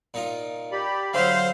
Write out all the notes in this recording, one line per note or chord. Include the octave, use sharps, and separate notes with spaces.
A#2 D#4 F4
G4 D5 B5
D3 F#3 C5 E5 F5